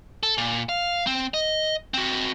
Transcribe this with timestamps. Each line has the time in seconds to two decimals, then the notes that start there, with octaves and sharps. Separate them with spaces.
0.23 A4
0.38 A#2
0.69 F5
1.07 C4
1.34 D#5
1.94 C4 F#4